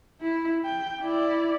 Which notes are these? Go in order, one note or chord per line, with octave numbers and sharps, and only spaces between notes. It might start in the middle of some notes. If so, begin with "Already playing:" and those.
E4
G5
E4 D5